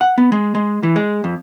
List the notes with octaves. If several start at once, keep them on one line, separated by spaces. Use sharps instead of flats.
F#5
B3
G#3
G#3
E3
G#3
F2